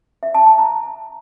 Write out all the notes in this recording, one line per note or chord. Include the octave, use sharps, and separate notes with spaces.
E5
A5
A5
A#5